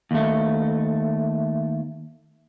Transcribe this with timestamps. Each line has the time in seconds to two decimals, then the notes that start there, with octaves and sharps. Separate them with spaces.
0.11 D#2 A3